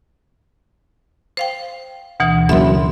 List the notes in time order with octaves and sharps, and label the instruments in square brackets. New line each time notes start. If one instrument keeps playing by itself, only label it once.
[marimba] C5 F5 G5
D2 B2 E3
[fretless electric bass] F#1 F#2 [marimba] E5 B5 C6